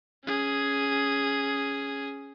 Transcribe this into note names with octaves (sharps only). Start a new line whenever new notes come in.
C#4 G#4